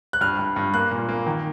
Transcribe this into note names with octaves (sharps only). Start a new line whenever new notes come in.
F#6
G2 F6
G2
G2
A#3 F#6
A#2
A#3
D#3